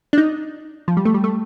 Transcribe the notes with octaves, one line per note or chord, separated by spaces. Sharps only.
D4
D#4
F3
G3
A3
G3
A3